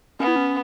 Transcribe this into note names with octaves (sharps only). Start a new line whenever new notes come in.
B3 C#4
E4
C#4